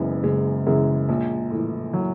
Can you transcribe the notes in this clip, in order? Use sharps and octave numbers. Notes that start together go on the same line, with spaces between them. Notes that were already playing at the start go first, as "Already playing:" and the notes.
Already playing: F#1 F#2 C#3 E3 G#3 B3
F#1 G#3
F#2 C#3 E3 G#3
A#1
A2 E3
F#3